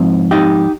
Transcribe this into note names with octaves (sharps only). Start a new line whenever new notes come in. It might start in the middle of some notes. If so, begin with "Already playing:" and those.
Already playing: G#2 F3 C4
D#4 G4